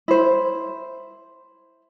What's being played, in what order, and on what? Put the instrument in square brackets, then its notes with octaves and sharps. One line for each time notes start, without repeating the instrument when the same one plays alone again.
[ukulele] E4 C5